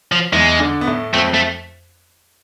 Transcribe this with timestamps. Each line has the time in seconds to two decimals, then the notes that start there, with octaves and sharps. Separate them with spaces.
0.12 F3
0.32 E2 E3 G#3
0.59 D3 D4
0.81 B3
0.87 A2 A3
1.14 F2 F3 A3
1.30 F3 A3